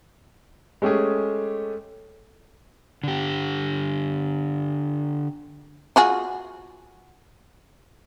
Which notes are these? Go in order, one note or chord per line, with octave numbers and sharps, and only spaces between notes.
G#3 A3 C#4 G4 G#4
D3 G4
F4 F#4 G#4